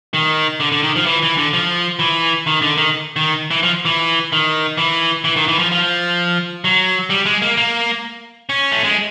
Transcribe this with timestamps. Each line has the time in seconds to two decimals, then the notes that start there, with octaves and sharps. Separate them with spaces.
0.14 D#3
0.60 D3
0.72 D3
0.83 D#3
0.96 F3
1.06 E3
1.23 E3
1.37 D3
1.53 F3
1.99 E3
2.47 D#3
2.62 D3
2.77 D#3
3.16 D#3
3.51 E3
3.63 F3
3.85 E3
4.32 D#3
4.78 E3
5.24 E3
5.36 D#3
5.48 E3
5.59 F3
5.72 F3
6.64 F#3
7.10 G3
7.26 G#3
7.42 A#3
7.57 A#3
8.49 C#4
8.72 A3
8.84 G#3